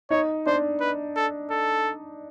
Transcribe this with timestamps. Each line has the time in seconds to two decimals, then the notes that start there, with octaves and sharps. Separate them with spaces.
0.10 D#4 C#5
0.46 D4 C5
0.80 B4
1.16 A4
1.51 A4